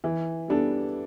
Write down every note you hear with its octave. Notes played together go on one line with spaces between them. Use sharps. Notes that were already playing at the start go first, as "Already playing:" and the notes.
E3
G3 B3 D4 A4